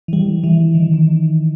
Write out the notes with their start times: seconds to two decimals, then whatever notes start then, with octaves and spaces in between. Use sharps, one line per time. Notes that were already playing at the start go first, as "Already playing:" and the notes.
0.08 E3
0.13 G3
0.44 E3
0.75 D#3
0.94 D#3